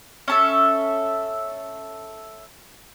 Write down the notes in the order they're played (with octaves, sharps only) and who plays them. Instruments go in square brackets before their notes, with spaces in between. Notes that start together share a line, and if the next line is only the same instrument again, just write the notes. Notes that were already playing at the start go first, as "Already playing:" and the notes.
[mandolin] C#4 A4 E5